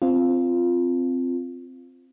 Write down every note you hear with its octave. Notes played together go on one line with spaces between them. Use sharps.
C4 F4